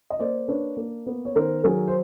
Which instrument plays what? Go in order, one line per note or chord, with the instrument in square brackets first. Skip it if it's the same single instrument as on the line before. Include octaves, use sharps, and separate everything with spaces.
[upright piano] D#5
A#3 C5 D5
D4 B4 C#5
A#3
B3
C#5
D#3 A#4 C5
F#3 G#4 A#4
C5